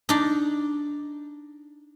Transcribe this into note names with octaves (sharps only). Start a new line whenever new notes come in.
D4 D#4